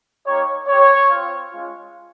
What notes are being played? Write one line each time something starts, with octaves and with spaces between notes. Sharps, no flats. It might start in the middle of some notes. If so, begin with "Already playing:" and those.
A#3 D#4 G4 C#5
C4 G4 C#5
C4 F4
G#3 C#4 F4